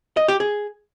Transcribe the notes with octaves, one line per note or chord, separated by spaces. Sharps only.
D#5
G4
G#4